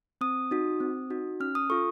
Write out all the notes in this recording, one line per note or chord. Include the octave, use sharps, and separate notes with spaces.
C4 D#6
D#4 F#4
C4
D#4 F#4
C#4 F6
D#6
F4 A4 C#6